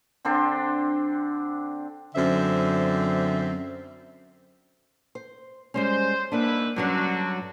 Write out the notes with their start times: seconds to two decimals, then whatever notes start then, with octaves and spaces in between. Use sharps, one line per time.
0.25 D3 C4 D4 C5
2.16 F#2 D3 C4 C5 E5
5.15 C5
5.74 G3 G#3 C#4 C5
6.32 G#2 A#3 D4 E4 B4
6.76 G2 D3 F#3 C#4 F#4